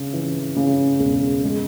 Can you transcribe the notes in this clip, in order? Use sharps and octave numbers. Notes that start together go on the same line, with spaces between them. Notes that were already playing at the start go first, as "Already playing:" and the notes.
Already playing: C#3
E3
C#3
E1
G#3